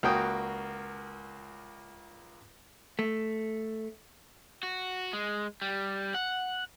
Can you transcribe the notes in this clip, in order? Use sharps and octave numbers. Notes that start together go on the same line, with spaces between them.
C#2 A#3 F#4 G5 D#6
A3
F#4
G#3
G3
F#5